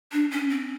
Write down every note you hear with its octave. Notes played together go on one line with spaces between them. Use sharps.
D4
C#4
C4